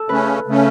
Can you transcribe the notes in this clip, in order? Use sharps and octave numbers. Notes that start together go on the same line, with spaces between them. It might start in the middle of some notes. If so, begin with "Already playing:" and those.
Already playing: A4
C#3 A3 C#4 B4
C#3 A3 C#4